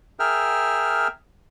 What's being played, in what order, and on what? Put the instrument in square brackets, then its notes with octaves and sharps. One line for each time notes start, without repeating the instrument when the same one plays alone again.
[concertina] G#4 A#4 E5 G5 F6